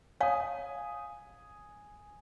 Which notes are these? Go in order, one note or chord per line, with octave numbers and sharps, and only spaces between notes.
C#5 F5 G#5 D#6